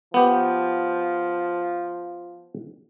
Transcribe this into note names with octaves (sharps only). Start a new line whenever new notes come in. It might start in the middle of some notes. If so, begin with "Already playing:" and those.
F3 B3 G4